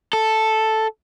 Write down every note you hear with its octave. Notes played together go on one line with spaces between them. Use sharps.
A4